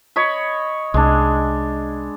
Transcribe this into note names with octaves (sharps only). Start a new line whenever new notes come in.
C#5 D#5 B5
C2 G#3 D4